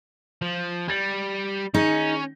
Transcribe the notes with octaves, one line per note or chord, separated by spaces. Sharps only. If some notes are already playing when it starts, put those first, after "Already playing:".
F3
G3 G6 A6 F#7
D#3 C#4 D#4 G#4